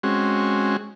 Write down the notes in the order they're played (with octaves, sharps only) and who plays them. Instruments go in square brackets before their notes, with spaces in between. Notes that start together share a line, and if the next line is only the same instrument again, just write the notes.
[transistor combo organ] G#3 C4 C#4 F#4